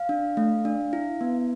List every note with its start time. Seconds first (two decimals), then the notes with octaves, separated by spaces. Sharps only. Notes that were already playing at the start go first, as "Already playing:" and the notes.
Already playing: F5
0.09 D4
0.37 A3
0.65 D4
0.93 E4
1.21 B3